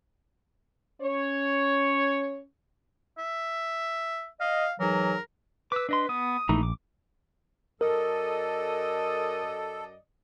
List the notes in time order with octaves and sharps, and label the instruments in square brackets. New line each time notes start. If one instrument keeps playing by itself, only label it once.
[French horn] C#4 [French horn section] C#5
[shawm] E5
[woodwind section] D#5 [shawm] F5
[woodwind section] G#2 E3 F#3 [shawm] A#4
[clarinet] B4 [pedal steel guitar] D6 E6
[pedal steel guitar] D4 D#5 C6 [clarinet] B4
[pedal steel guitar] B3 [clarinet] D#6
[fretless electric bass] A#1 [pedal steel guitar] E3 A3 D#4
[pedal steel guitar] D6
[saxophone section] F#2 D5 D#5 [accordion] A4 [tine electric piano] A#4